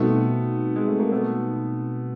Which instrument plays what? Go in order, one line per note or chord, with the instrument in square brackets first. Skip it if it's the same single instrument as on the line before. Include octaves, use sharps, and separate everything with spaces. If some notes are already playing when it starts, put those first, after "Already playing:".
Already playing: [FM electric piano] B2 G3 C4 D#4 F#4 [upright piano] A3 B3
[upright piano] G#3
A3
A#3
A3 B3